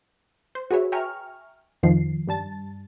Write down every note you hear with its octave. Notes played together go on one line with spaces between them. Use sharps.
C5
F#4 G#4 B4 C#5 E5
E5 G5 G#5 A#5 C#6 F6
F2 D#3 F3 C7
G2 G3 A5 A6